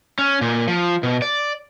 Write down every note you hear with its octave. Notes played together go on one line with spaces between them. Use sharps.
C#4
A#2
F3
B2
D5